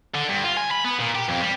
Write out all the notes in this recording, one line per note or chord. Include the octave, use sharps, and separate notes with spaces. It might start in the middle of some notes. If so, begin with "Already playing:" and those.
D3
G2
F4
G#5
B5
B3
A#2
G4
F2
G3